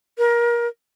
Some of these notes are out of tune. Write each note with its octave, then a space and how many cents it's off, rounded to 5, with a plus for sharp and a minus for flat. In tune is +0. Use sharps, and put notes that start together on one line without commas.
A#4 +25